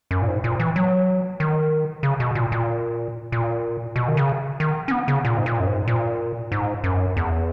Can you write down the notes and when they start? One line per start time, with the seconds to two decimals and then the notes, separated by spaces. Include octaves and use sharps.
0.11 F#2
0.22 A#2
0.28 G#2
0.44 A#2
0.60 E3
0.76 F#3
1.40 D#3
2.03 C#3
2.20 B2
2.35 A#2
2.52 A#2
3.32 A#2
3.96 B2
4.08 D#3
4.17 C#3
4.60 D#3
4.88 C#4
4.91 B3
5.08 C#3
5.25 A#2
5.38 G#2
5.46 A#2
5.60 F#2
5.67 G#2
5.88 A#2
6.52 G#2
6.84 F#2
7.17 E2